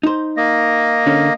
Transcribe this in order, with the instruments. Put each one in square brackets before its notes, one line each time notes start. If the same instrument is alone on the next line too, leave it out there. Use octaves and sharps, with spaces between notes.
[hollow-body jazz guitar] D#4 C5
[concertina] A#3 D#5
[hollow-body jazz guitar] D3 C#4